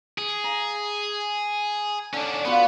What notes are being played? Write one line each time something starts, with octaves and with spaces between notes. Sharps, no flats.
G#4
A#5
D3 C#4 D4
B3 F4 F#4 B4